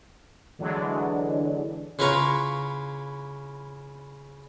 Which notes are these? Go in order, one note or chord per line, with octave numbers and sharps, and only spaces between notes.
D3 E3 F#3 G#3 D4
C#3 E4 F4 B4 A#5 C#6